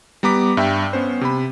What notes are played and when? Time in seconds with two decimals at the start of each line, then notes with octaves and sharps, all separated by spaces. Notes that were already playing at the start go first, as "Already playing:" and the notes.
0.23 G3 B3 A#5 D6 B6
0.57 G2 E5 G5
0.93 B3 C#4 C5
1.21 C3 B5